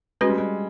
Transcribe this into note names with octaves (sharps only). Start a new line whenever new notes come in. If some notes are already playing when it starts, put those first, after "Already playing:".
G#3 C#4 F#4 B4
G3
G#3